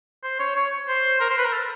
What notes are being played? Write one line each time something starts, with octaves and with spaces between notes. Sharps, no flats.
C5
C#5
C#5
C5
A#4
C5
B4
A#4
A4